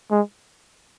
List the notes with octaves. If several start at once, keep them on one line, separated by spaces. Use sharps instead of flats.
G#3